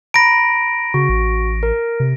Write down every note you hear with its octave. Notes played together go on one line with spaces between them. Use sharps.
A#5 B5 A#6 D7
C#3 F#4
A1
A#4
C3